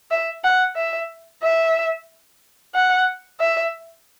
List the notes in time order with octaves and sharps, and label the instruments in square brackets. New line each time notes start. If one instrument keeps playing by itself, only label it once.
[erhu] E5
F#5
E5
E5
F#5
E5